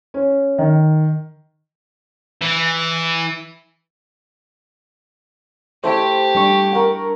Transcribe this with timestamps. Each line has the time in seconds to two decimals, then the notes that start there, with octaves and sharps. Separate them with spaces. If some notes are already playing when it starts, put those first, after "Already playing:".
0.14 C#4
0.58 D#3
2.41 E3
5.84 A3 E4 G4 C5
6.35 G3 D4 C#6
6.72 A#4 F#5